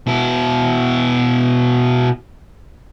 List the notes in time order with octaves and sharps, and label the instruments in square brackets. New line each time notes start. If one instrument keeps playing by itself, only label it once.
[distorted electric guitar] B2 E4